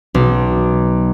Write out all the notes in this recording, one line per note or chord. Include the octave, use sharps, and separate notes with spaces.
B1